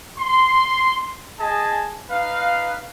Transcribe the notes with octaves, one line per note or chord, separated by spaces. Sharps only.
C6
G#4 D#5 G#5 A5
D#4 B4 F5